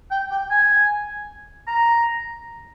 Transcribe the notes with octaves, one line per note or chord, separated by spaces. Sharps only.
G5
G5
G#5
A#5